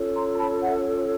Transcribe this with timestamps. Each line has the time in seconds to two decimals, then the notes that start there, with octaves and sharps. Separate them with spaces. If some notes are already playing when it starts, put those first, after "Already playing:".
Already playing: C#4 F4 A4 C#5
0.15 A#5 C6
0.34 A#5
0.38 A5 B5
0.62 E5 F#5